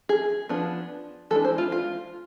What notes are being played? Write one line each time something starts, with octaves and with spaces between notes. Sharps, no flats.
G#4
F3 B3 D4
E3 G#3 D4 A4
C5
F4
F4